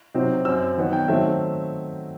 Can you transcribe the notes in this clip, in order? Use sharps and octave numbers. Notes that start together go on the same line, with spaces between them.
C3 F#3 C4 D#4
F#2 F#3 C4 E6
D#3 F#3 B3 D#4
G5
D#3 F#3 A3 C4 D#4 E5